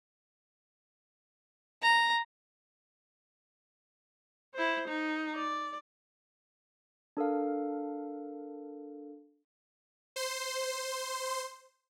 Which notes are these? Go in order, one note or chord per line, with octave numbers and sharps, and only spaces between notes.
A#5
E4 C5
D#4
D5
D4 A4 A#4 F5
C5 C6